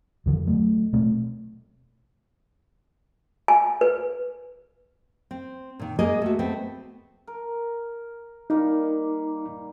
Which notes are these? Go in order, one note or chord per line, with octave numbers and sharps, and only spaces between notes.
F2 D3 E3 F3
F#3 A3
B2 A3 C4
G#5
B4
C4
A#2 D#3
G#3 A#3 G#4 A#4 D#5
A3 F#4
A3 B3 C4
A#4
G3 A#3 D#4